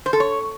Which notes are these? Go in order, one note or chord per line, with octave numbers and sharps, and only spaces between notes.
C5
A4
C#5